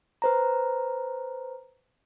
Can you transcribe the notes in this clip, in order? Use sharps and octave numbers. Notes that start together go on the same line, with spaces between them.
B4 C5 A#5